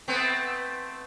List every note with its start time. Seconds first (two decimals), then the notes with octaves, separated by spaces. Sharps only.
0.08 A3 B3 C4